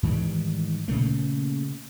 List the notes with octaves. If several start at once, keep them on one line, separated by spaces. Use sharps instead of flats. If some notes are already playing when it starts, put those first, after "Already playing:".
G#2 D#3 E3 G3
A#2 C#3 A3 A#3